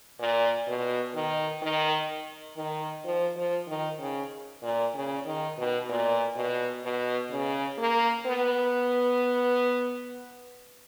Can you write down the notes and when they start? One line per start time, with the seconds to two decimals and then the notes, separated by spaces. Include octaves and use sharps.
0.20 A#2
0.67 B2
1.14 D#3
1.62 D#3
2.57 D#3
3.05 F3
3.36 F3
3.68 D#3
3.99 C#3
4.63 A#2
4.94 C#3
5.26 D#3
5.58 B2
5.89 A#2
6.36 B2
6.84 B2
7.32 C#3
7.79 A#3
8.26 B3